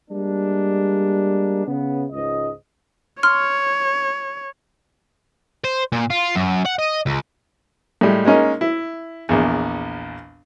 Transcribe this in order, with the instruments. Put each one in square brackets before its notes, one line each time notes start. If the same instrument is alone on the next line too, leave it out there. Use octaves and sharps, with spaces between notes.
[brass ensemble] G3 G#3 A#3 D4
C#3 B3
C#2 G#2 D#5
[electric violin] C#5 [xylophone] C6 F6
[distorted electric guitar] C5
A#2
F4
F#2
F#5
D#5
C#2
[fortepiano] A2 G3 G#3
G#3 A#3 C#4 D#4
E4
A#1 E2